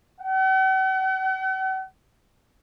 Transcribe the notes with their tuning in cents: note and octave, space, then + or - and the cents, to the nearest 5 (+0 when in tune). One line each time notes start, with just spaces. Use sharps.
F#5 +45